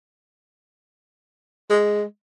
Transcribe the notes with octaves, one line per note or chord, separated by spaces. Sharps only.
G#3